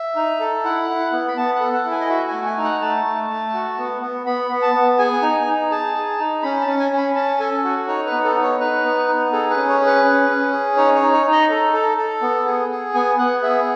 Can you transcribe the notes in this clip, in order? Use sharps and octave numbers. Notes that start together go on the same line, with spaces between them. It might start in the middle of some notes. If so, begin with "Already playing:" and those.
Already playing: E5
D#4
A4
E4 F#5
E4
B3
B5
B3 A5
F#5
A4
F#5
E4
G#5
D#5
F#4 E5
A3 G#5
G#5
D#4
F#5
A3 A5
A3
A3
F#4
B3
B3
B3 B5
B3
A5
B3
G#4 G#5
D#4
D#4
G#4 A5
G#4
D#4
C#4 B5
A5
C#4
G#5
C#4
B5
C#4 A5
A4 G#5
F#4
D#4 C#5
B4
B3
A4
D#4
C#5
D#4 B4
B3
D#4
G#4 A4
B4
C#4
C#5
G#4
B4
C#4
C#4
G#4
D#4 C#5
C#5
D#4
C#5
D#4
D#5
A4
A4
A4
B3
G#4
G#4
B3 G#5
B3 F#5
G#4 E5